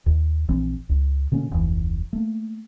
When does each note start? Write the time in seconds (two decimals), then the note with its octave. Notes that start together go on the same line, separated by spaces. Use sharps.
0.06 D#2
0.48 A#1 E3 C4
0.89 C#2
1.32 B2 D3 A#3 C#4
1.51 F1 D2 E3
2.13 A3 A#3